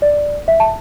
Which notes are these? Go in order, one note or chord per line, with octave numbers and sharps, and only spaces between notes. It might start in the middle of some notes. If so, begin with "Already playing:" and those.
D5
E5
A5